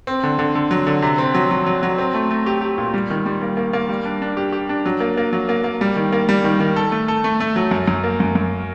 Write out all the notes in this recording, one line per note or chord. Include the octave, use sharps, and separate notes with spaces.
C4
D3
D3
D3
F#3
D3
C3
C4
F#3
F#3
F#3
F#3
C4
A3
A3
G4
G4
A#2
G3
D#3
G3
A#3
A#3
A#3
G3
D4
D4
G4
G4
D4
F#3
A#3
A#3
F#3
A#3
A#3
G3
D#3
A#3
G3
D#3
D#3
A4
A3
A4
A3
A3
F#3
F#2
F#2
A#3
F#2
F#2